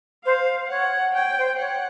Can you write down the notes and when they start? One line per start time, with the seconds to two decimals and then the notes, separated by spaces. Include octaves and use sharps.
0.25 C5 F5
0.70 C#5 F#5
1.14 C#5 G5
1.37 C5
1.59 C#5 F#5